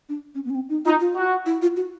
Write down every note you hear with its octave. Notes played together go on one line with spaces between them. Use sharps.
D4
C#4
B3
C#4
C4
D#4
D#4 F4
F4
F#4
E4
F4
F#4